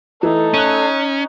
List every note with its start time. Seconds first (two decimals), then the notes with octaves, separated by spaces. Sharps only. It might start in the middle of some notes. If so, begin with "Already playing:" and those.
0.23 E3 A3 D#4 A4
0.54 C#4 F#6 D#7